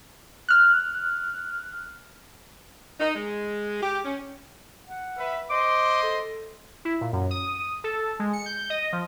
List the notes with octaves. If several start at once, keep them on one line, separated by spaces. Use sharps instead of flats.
F6 F#6
D#4
G#3
G4
C#4
F#5
B4 E5
C5 D#5 C6 D6
A4
E4
A#2
F#2
D#6
A4
G#3
C#7
G6
D#5
F3